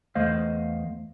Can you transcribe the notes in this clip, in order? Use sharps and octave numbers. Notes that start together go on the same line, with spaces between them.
E2 A3 C5 D#5 F5